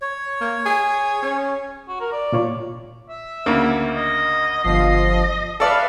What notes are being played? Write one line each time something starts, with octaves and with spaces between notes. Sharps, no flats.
C#5
A#3
G#4
C#4
F#4
A#4
D5
A#2 F4 C#5
E5
D2 C#3 A#3
D#5
G1 F3 D#5 C7
A4 B4 D5 E5 F5